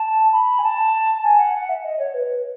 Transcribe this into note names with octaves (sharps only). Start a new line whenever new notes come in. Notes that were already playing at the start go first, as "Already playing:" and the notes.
Already playing: A5
B5
G#5
A5
G#5
F#5
F#5
E5
D#5
C#5
B4